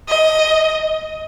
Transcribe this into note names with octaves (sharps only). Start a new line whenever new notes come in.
D#5